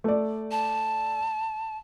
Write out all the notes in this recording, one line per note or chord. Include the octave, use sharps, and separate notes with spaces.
A3 D5
A5